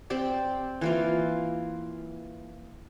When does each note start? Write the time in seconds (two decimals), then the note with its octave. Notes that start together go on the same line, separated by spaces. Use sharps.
0.10 C4 G4 D5
0.81 E3 A#3 F4